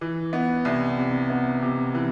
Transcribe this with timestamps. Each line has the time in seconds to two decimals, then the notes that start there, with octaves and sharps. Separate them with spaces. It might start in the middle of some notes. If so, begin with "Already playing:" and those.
0.01 E3
0.33 B3
0.65 C2
0.98 C3
1.30 B3
1.62 C3
1.94 E3